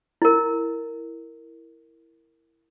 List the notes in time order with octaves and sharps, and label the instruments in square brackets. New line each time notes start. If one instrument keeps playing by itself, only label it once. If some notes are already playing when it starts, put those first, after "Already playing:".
[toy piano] E4 A#4